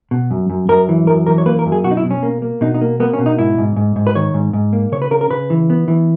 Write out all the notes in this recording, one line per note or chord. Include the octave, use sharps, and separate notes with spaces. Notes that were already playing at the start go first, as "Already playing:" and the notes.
B2
F#2
F#2
F#2 A#4
E3
F#2 A#4
E3 A#4
C#5
A#3 B4
A#4
F#2
G#4
B2 F#4
D#4
E4
B2
C#4
A#3
A#3
B2 D#4
D#4
A#3
A#3 B3
C#4
B2
D#4
G#2 E4
G#2
G#2
G#2
B4
D#3 C#5
G#2
G#2
A#3
C#3 C#5
B4
C#3 A#4
A#4
C#3 B4
E3
B3
E3